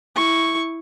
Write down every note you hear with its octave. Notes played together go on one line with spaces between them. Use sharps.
E4 C#6